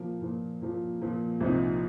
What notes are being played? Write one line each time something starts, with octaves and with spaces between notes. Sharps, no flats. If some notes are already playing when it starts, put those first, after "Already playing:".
Already playing: A#2 F3 A#3
A#2 F3 A#3
A#2 F3 A#3
A#2 F3 A#3
C2 A#2 F3 C4 D#4